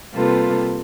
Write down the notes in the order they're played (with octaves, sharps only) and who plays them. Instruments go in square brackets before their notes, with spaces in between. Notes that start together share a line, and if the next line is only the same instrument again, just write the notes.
[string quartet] C3 G3 A#3 F4 A4 B4